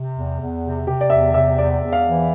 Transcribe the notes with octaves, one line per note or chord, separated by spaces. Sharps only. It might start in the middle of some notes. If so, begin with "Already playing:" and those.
Already playing: C3
E2
E2
C3
C3 G4
D5
E2 E5
C3 E5
E2 D5
E2
F5
E3